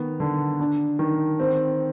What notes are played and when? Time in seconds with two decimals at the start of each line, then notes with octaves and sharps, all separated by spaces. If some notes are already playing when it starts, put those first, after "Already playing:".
Already playing: D#3 B3
0.20 D3
0.60 D4
0.99 D#3
1.40 C4